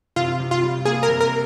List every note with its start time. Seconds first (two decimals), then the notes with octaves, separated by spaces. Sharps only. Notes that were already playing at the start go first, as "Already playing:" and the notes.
0.16 C3 F4
0.40 C3
0.51 F4
0.63 G3
0.85 A#3 G#4
1.03 A#4
1.09 C3
1.20 A#4